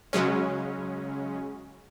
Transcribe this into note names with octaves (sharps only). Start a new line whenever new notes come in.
C#3 F#3 G#3 C#4